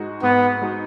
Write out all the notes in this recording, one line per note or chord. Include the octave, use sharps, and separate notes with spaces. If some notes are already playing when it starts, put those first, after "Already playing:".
Already playing: G#2 G#3 D#4 F#4
G#2 B3
G#3 D#4 F#4